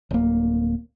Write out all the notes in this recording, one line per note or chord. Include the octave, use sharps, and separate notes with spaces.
D1 A#3